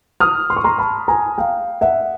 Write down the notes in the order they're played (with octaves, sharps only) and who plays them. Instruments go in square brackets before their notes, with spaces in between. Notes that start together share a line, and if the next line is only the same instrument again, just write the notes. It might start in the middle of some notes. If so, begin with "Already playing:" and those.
[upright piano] D#6 F6
C6
C#6
A#5 C6
A5 B5
G#5 A#5
F5 G5
E5 F#5